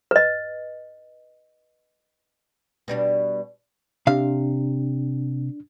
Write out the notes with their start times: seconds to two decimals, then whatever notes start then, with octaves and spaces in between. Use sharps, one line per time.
0.11 B4 D#5
2.88 B2 G3 D4
4.07 C3 D4 F5